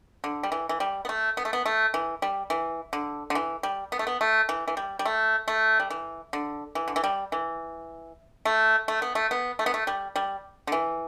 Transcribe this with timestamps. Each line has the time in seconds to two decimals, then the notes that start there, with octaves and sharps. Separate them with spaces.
0.24 D3
0.43 G3
0.52 E3
0.69 E3
0.80 G3
1.05 B3
1.09 A3
1.37 B3
1.45 A3
1.53 B3
1.66 A3
1.94 E3
2.22 G3
2.50 E3
2.93 D3
3.30 D3
3.35 E3
3.63 G3
3.92 B3
3.99 A3
4.07 B3
4.21 A3
4.49 E3
4.68 E3
4.77 G3
4.99 G3
5.05 A3
5.48 A3
5.80 G3
5.90 E3
6.33 D3
6.75 E3
6.88 D3
6.96 E3
7.04 G3
7.32 E3
8.45 A3
8.88 A3
9.02 B3
9.15 A3
9.31 B3
9.59 A3
9.66 B3
9.74 A3
9.87 G3
10.16 G3
10.67 D3
10.72 E3